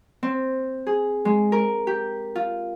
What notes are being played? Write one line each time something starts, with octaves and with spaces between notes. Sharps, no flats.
C4
G#4
G#3
A#4
G4
F4